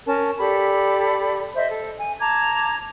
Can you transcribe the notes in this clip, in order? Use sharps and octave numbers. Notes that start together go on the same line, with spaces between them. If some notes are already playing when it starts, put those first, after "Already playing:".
C#4 A#4 A5
G4 A4 D5 B5
C5 D#5 E5
A4
G#5
A5 A#5 D6 G#6